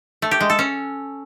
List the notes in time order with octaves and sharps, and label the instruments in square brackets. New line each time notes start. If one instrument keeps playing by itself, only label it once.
[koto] A3
G4
G#3
A4
C#4